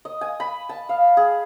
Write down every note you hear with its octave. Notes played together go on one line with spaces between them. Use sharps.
D#5
G#5
B5
A5
F5
G#4